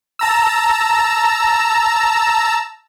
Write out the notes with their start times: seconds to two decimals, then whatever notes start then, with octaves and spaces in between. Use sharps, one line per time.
0.19 A5 A#5 E6